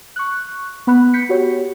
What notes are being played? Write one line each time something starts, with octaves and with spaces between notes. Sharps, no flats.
C#6 F#6
B3 B5 F#6
G6 B6 C#7
F#4 G4 C#5